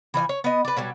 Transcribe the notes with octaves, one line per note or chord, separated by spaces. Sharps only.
E3 F3 D#5 G#5
C#5
B3 D#5
B4 D5
B2 F#3 G3